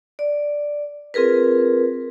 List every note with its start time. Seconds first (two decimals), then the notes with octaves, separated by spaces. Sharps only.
0.19 D5
1.14 C4 F4 G#4 A#4 B4